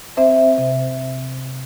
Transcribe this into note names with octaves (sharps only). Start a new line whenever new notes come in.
C4 C5 E5
C3